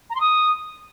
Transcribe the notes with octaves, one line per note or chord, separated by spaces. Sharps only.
A#5
C6
D#6